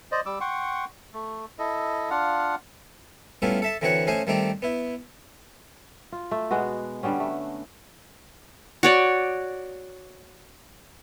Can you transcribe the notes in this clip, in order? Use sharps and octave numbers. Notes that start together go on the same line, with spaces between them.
C5 D5 D#5
G3 D6 E6
F#5 G5 C6 C#6
A3
E4 A4 D#5
D4 F4 F5 F#5
G3 A3 B3 C#4 E4 F4
A4 E5 A5
D3 E3 C4 F#4 C#5 F#5
A3 C#4 C5 D#5 G#5
D#3 G3 A3 C4 D5 A#5
B3 E4
F4
A3
B2 G#3 B3 F#4
D3 G3 B3 C#4
A3
F#4 C#5 D5